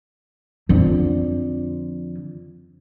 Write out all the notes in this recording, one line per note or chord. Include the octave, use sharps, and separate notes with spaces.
F2 D3